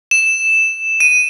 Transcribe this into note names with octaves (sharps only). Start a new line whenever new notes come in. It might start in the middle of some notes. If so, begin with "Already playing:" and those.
E7
D#7